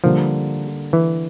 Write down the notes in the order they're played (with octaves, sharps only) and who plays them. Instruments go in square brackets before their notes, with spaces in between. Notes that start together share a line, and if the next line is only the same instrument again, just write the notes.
[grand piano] D3 G3 A#3 [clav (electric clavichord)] F3
[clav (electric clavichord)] E3